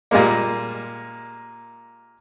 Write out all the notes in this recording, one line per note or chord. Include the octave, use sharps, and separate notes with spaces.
A#2 G3 G#3 A#3